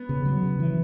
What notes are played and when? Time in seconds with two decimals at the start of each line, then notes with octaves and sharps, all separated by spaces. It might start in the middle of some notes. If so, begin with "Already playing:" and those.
Already playing: B3
0.09 C#3
0.25 F#3
0.43 C#3
0.60 E3